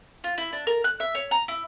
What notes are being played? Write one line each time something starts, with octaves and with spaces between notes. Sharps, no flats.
F4
E4
D4
A#4
F#6
E5
C#5
A#5
E4